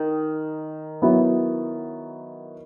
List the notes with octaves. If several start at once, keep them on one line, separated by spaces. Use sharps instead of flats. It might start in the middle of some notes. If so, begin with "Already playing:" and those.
Already playing: D#3
F#3 B3 E4